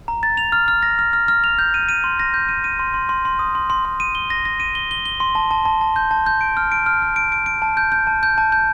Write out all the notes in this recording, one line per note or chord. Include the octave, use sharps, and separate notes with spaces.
A#5
A6
F7
F6
F6
A#6
F6
F6
F6
F7
G6
D#7
D#7
C6
A#6
G6
D#7
D#7
C6
C6
C6
C6
D#6
C6
C6
C6
D#7
G7
A#6
A#6
D#7
G7
G7
G7
C6
A5
A5
A5
A5
G6
A5
G6
D7
F6
D7
F6
F6
D7
D7
D7
A5
G6
G6
A5
G6
A5
G6